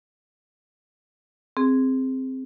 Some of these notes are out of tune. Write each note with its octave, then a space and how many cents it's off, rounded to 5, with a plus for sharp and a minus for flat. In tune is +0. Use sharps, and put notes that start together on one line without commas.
C4 +0 G#4 +0